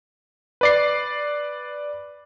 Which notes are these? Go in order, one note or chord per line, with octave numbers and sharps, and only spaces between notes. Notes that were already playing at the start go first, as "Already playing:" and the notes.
B4 D5 C7